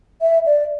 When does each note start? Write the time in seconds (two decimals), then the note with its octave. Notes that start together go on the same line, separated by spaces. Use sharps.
0.21 E5
0.46 D5